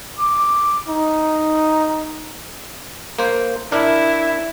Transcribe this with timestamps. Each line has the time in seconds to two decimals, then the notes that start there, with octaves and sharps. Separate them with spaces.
0.19 D6
0.88 D#4
3.19 A#3 C5
3.72 D4 E4 A#4